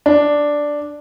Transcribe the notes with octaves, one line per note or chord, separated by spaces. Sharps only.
D4